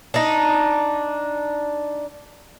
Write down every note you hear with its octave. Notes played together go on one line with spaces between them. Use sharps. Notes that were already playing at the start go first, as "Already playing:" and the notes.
D4 D#4